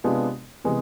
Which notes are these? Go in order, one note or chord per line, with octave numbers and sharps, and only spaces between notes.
C3 G#3 B3 D4 F4
C3 E3 G#3 B3